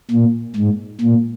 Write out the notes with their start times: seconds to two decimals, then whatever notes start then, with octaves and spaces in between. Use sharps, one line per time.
0.11 A#2
0.56 G#2
1.01 A#2